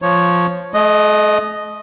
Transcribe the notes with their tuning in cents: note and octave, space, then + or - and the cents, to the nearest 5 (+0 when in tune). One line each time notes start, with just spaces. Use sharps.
F3 +0 C#5 +0
A3 -45 D#5 +0